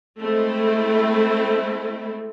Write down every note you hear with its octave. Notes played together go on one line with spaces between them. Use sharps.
G#3 A3 C4 E4